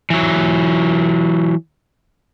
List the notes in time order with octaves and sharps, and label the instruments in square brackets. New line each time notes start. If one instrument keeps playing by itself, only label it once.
[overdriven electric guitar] E3 F#3